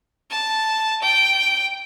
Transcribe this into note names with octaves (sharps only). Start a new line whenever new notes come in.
A5
G5